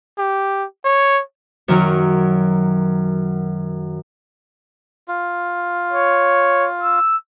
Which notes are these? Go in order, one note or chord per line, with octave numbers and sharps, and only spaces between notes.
G4
C#5
F#2 D#3 F#3
F4
C#5
E6